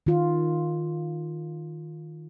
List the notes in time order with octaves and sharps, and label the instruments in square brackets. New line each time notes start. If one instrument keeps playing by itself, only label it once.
[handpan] D#3 F4